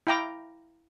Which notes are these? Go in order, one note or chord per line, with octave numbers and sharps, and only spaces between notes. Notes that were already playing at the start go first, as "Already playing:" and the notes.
E4 F5 G5 A#5 D6